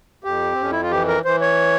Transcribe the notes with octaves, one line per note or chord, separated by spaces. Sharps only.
F2 G4
C4
F2 C#4
E4
F4
E3 G4
A#4
E3 C5
C#5